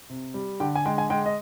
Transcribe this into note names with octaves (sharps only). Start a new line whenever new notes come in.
C3
G3
D3 G5
G#5
G#3 G5
G#5
G#3 G5
D#5